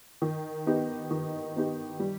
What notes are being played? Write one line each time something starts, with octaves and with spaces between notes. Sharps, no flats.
D#3
B3 D#4 G4
D#3
B3 D#4 G4
G3